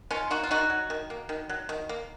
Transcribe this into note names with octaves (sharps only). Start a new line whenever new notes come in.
D#3 C#4 F4
A#3 D#4 F#4
F4
D#3 D#4 F#4
F#3
D#3
A#3
D#3
F#3
D#3
A#3